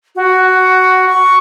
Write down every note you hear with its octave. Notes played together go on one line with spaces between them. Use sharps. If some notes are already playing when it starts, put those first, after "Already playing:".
F#4
C#6